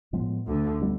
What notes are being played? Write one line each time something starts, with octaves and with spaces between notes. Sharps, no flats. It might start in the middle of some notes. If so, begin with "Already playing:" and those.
A2 F3 G#3 B3
D2 D3
G3 B3